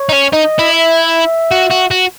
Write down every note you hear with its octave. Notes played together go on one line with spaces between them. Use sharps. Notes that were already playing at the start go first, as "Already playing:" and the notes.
Already playing: C#5
D#4
C#4
D#4 D#5
E4
E5
F#4
F#4
F#4